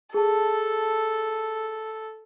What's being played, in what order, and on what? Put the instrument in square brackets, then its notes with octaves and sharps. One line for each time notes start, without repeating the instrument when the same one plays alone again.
[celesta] G#4 A5 [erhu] A4